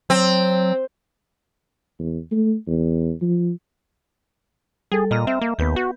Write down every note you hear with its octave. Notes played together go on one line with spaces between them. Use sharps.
F#3 C4
E2
A3
E2
F3
G3 G#4 A4
A#2 D#5 A#5 F6
C4 E5
A#3
D#2 B3 B4 G6
F#4